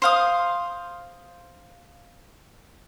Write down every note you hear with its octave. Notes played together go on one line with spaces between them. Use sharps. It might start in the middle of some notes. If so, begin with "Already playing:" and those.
C5 F5 D#6